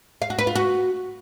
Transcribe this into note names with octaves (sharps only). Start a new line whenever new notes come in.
F5
F#4
B4
F4
F#4